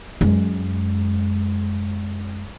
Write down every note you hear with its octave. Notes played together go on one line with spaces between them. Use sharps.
F#2 G#3